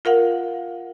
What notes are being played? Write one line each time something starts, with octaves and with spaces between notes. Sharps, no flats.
F4 A#4 F5 F#5